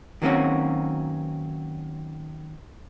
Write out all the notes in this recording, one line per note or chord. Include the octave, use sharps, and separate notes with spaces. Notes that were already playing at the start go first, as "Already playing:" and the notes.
D#3 F#3 A#3 C4 C#4 F#4